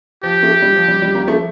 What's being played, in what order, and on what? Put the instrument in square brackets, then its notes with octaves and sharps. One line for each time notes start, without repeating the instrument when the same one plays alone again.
[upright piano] F3 [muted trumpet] G4
[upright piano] F3 A3
G3
F3
G3
G3
G3 A#3
F3 A3